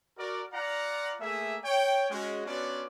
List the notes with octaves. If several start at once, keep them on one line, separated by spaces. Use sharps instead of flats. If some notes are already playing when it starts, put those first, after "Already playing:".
F#4 A#4 D5
F4 D5 F5 F#5 A#5
A3 A#3 G#4 E5
C#5 G5
G#3 C#4 F#4
B3 C#4 D4 F4 F#4 D5